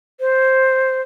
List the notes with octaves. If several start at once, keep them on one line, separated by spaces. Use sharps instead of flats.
C5